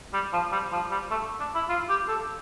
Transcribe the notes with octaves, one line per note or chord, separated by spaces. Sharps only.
G3
F3
G3
F3
G3
A3
D4
E4
F4
G4
A4